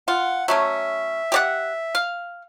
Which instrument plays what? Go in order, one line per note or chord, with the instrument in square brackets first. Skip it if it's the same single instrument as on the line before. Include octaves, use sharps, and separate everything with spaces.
[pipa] F4 [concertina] F#5
[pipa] F#3 A3 C#4 [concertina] E5
[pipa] G4 D5 F#5
F5